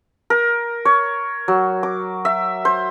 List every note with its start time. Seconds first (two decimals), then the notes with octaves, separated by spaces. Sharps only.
0.30 A#4
0.85 C#5
1.48 F#3
1.83 D6
2.25 E5
2.65 C5